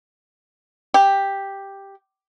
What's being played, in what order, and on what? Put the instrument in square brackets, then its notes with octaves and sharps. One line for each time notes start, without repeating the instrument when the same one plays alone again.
[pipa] G4